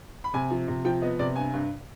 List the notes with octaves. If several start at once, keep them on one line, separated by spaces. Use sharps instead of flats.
B5
C3 G#5
F3
C3
F3 G5
B3 D#5
C3 D5
G2 G#5
G2